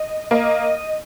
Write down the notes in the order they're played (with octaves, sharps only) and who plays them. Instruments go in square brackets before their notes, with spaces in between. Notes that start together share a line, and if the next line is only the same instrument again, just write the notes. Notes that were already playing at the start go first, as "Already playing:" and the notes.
Already playing: [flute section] D#5
[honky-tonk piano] A#3 [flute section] D#5